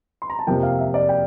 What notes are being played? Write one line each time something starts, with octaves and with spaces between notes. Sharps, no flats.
C6
A#5
A5
F2 C3 F3 A#3 G5
F5
E5
D5
G5